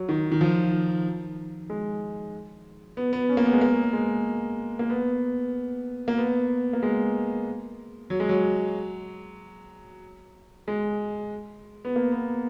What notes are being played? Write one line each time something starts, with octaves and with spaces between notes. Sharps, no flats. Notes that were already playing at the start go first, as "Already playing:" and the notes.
Already playing: F#3
D#3
D#3
F3
G#3
B3
B3
C#4
A#3
B3
G#3
A#3
G#3
A#3
B3
A#3
B3
A#3
G#3
F#3
G#3
F#3
G#3
B3
A#3
B3